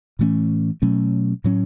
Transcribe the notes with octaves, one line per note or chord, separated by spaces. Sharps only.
A2 E3 A3 C#4
B2 F#3 A3 C#4
A2 F#3 C#4